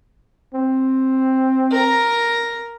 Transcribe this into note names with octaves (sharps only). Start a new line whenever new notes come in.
C4
A#4 A#5